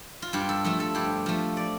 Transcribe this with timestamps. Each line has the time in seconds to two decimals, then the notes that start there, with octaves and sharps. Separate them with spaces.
0.22 F4
0.33 G2 G4
0.49 A4
0.64 F3 A3 A4
0.80 A4
0.95 G2 G4
1.26 F3 A3
1.57 D5